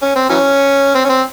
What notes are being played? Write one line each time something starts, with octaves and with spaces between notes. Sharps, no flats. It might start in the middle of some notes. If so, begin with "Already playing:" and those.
C#4
C4
E3 F#3 C#4
C4
C#4
C4